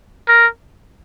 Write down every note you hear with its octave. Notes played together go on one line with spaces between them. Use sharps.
A#4